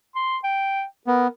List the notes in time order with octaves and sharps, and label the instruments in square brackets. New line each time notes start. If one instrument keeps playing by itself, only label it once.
[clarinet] C6
G5
[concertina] B3 [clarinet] A#4